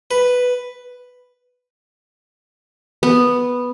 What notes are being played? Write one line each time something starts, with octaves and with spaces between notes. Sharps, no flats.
B4
B3